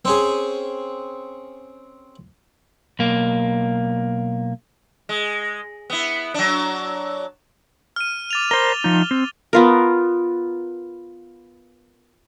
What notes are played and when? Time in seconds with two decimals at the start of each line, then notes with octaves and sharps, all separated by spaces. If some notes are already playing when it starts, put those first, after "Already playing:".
0.05 C4 C#4 G#4
2.99 B1 A#3
5.09 G#3
5.90 B3 E4
6.34 F#3 D4
7.96 F6 D#7
8.31 D6 A6 F7
8.51 A#4 C5 G7
8.84 F3 D#4
9.11 C4
9.53 B3 F4 A#4